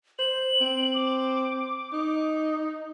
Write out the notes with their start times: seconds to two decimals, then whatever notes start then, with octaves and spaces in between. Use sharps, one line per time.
0.19 C5 F#7
0.61 C4
0.94 D6
1.93 D#4